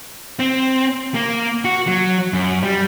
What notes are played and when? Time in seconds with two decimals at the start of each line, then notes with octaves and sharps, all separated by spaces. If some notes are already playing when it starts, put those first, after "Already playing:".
0.39 C4
1.14 A#3
1.65 F#4
1.87 F#3
2.33 F#2
2.63 G3